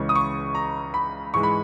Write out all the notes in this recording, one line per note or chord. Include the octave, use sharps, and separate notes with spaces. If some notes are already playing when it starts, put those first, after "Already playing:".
Already playing: C#2 C#3 E3 G#3 C#4 C#6
D#6
C#6
A#5
B5
G#2 E3 G#3 C#6
B5